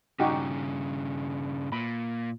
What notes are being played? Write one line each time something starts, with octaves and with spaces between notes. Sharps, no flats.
G2 C#3 D#4 F#4 G4
A#2 B5